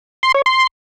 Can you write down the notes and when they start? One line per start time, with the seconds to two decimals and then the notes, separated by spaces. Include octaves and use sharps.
0.23 C6
0.35 C#5
0.46 C6